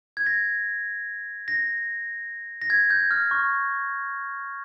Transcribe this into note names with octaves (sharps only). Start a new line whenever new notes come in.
G#6
A#6
A#6
A#6
G#6
G6
F6
C#6